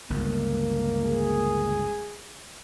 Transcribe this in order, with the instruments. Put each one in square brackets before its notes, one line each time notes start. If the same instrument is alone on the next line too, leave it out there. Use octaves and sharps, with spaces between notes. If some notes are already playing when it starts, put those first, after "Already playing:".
[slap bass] G1 C#2 [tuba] A#3
[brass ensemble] G#4